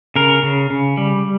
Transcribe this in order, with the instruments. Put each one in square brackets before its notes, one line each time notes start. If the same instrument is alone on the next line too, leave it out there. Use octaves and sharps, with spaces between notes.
[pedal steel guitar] C#3 A#4
C#3
C#3
G3